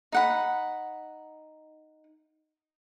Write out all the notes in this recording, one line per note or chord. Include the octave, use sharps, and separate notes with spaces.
D#4 F#5 B5